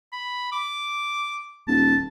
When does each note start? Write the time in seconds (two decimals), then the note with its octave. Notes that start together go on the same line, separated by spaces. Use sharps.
0.12 B5
0.52 D6
1.68 D#1 A5